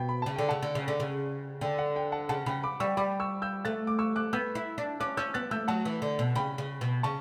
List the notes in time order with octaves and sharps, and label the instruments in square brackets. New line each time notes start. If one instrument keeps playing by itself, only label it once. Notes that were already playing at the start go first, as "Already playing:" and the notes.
Already playing: [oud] B2 [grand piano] G5
[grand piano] B5
[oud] C#3 [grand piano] A5
[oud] D3 [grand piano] G5
[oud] C#3 [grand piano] F#5 A5
[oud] D3
C#3
D3
C#3
[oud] D3 [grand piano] G5
[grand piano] F#5
G5
F#5 A5
[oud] C#3 [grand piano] F#5 A5
[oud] C#3 [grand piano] G5 B5
[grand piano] B5 D6
[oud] G3 [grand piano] C#6 E6
[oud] G3 [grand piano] B5 D6
[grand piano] C#6 E6
E6 G6
[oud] A3 [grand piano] F#6 A6
[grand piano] D6
C#6 E6
D6 F#6
[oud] B3 [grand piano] E6 G6
[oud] E4
D4
[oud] C#4 [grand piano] D6 F#6
[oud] C#4 [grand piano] E6 G6
[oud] B3 [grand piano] F#6 A6
[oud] A3 [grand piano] E6 G6
[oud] F#3 [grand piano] F#5 A5
[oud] E3
D3
B2
[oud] C#3 [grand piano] G5 B5
[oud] C#3
B2
[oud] C#3 [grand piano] A5 C#6